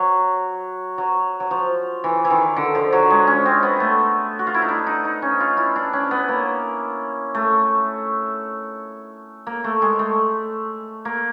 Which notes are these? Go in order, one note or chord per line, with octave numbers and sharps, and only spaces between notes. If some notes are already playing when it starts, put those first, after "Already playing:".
Already playing: F#3
F#3
F#3
F3
E3
E3
D#3
D3
F3
F#3
G#3
C#4
C4
B3
A3
F#4
F4
E4
D#4
D4
D#4
D#4
C#4
F4
E4
D4
C#4
B3
A#3
A3
A#3
A3
G#3
A3
A#3